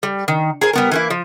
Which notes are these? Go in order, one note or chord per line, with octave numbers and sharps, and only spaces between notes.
G3
D#3
G#4 A#4 C5
G3 B3 A#4
E3 A#3 E4
F3